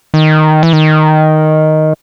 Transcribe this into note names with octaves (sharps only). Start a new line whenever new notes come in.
D#3
E3
D#3